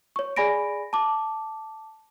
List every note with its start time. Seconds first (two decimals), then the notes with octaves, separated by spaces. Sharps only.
0.16 C#5 C#6
0.36 G#4 D5 G#5 B5 A#6 D7
0.93 A5 D6